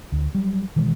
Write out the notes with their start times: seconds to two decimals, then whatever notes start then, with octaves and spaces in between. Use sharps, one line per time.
0.12 D2
0.35 F#3 G3
0.76 B2 D#3 E3 G#3